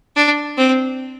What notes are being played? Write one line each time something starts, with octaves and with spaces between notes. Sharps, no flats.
D4
C4